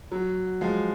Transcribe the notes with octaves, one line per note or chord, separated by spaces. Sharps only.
F#3
F3 G#3